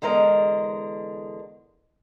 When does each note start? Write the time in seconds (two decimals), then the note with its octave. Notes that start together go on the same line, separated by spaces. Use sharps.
0.02 E2 D3 G#3 A#4 D#5